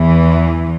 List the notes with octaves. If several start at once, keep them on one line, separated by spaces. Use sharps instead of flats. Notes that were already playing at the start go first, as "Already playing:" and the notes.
Already playing: E2 E3